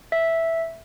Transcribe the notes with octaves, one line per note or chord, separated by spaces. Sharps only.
E5